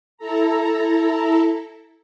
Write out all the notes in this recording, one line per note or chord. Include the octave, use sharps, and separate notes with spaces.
E4 A4 A#5